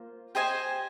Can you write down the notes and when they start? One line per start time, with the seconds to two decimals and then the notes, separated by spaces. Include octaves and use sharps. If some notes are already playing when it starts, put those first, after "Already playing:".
Already playing: A#3 F4 C5
0.35 G4 C5 D#5 G#5